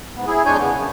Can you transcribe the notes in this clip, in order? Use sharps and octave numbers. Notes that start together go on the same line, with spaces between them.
G#2 B3
E4 G#4
F2 G#3 D4 C#5 G#5 G6
C#3 B3
F#2